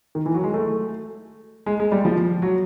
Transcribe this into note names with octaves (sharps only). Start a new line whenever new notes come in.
D#3
E3
F#3
G#3
A3
G#3
G#3
G3
F3
F#3